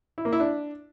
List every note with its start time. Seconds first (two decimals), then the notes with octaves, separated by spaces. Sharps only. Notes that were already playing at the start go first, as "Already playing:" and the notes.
0.18 E4
0.25 A#3
0.33 E4
0.40 D4